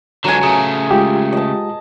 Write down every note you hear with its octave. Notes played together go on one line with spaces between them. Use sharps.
D3 F#3 G#3 G#5
C#3 A3 G#4
G#3 F4 G4
D#5 A5